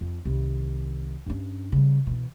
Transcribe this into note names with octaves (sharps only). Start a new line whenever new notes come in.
F2
C2 D#3
G2 C#4
C#3 G3
B2 E3